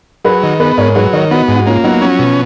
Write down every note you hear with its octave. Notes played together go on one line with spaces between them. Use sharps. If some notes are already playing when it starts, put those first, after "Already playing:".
F#3 G#4 B4
D#3
B3 G#4 B4
G#2 A#4 C#5
F#3 G#4 B4
D#3 A#4 C#5
B3 D#4 F#4
G#2
F#4
A#3 C#4 F4
F#3 B3 D#4
F3 C#4
B2